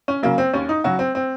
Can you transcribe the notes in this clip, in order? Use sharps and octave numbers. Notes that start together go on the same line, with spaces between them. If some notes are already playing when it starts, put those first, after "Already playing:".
C#4
C#3 F#3 A#3
C4
D#2 C#4
D#4
C#3 F#3 F#4
C4
C4